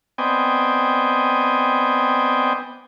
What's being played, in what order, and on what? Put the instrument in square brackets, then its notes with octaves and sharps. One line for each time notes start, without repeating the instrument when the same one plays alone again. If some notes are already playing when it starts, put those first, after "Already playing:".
[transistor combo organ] B3 C4 D5 D#5 G5 G#5